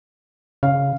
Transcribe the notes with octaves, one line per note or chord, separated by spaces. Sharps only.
C#3 F5